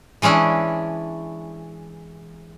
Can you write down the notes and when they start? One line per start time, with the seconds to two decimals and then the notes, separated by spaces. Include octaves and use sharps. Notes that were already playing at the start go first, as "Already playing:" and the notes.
0.22 E3 G#3 C#4 D4 E4